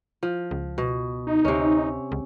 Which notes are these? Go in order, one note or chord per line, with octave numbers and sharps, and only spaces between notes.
F3
C#2
B2
D#4
D2 C3 C#4
C#2